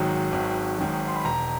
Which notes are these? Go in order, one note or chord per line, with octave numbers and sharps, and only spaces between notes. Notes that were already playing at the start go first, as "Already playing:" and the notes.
Already playing: G#1 G#2 D#3 F#3
G#1
G#2 D#3 F#3
C6
B5
E1 A#5